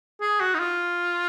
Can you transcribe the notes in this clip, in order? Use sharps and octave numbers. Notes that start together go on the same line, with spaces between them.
G#4
F#4
D#4
F4